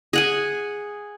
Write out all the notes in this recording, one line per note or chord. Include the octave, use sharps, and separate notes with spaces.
G#4 F#5 G#5